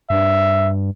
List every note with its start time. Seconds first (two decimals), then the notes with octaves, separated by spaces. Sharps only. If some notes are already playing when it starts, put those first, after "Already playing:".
0.10 G2 E5